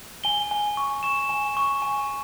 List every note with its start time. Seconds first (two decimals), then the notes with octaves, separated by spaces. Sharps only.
0.24 G#5 G7
0.51 G#5
0.77 C#6
1.03 C#6 E7
1.29 G#5
1.57 C#6
1.82 G#5